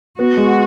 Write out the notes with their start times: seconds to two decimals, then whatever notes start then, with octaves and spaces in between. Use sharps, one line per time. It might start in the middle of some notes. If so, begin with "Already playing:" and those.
0.19 B3 F#4
0.37 G#3